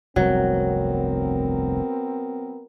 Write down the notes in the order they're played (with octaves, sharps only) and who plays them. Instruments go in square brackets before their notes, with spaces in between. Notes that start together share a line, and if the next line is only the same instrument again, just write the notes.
[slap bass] F1 C2 G2 [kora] F#3 [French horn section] B3 C4 A#4